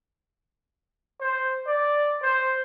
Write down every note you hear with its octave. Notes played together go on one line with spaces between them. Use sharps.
C5
D5
C5